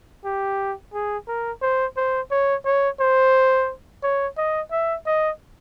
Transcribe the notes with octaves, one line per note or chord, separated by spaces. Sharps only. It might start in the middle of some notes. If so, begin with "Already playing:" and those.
G4
G#4
A#4
C5
C5
C#5
C#5
C5
C#5
D#5
E5
D#5